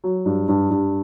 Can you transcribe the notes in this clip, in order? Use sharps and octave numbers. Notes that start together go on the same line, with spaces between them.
F#3
G2
G2
G2